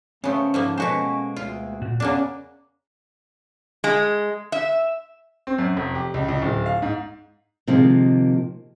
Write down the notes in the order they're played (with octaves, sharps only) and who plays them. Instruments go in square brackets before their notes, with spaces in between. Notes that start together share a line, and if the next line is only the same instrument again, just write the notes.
[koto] C#3 B3 [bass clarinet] A3 [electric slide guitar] C#4 A#4 C5
[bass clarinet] G#2 [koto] F3 A3 A#3
[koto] B2 F#4 C5 [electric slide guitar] G#3 A#3 B4 [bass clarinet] C#4
[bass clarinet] D2 [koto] F4
[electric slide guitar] A#2 F#4
[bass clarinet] E2 [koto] C#3 A#3 D4 [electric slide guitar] C#4
[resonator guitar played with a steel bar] G#3
E5
[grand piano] C4
F#2
F1
G4
C#2
C#2
D1
F5
G#2
[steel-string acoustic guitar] C3 D#3 F3 G#3 A#3